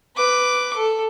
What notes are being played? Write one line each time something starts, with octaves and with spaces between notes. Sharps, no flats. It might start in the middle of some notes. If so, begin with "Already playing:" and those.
B4 D6
A4